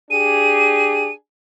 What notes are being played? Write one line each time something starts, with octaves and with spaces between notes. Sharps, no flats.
D4 G4 G#4 D#7